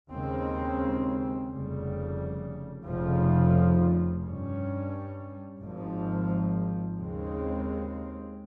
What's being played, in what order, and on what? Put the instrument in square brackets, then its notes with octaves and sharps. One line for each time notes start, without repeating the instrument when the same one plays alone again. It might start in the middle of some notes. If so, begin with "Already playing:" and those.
[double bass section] D#2 C#3 G#3 C4
F1 F2 C#3 G3
F1 F2 C#3 F3
G2 G3 C#4
G#1 G#2 F3
D#2 C#3 G#3 C4